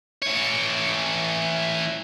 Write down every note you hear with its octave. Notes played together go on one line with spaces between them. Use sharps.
E3 C#5